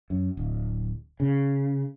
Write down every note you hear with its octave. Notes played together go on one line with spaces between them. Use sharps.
F#2
D1
C#3